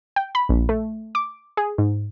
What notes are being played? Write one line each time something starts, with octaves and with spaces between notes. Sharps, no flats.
G5
B5
A#1
A3
D6
G#4
G#2